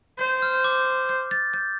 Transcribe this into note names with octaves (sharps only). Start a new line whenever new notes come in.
C5 G6
F6
D6
G6
A6
G6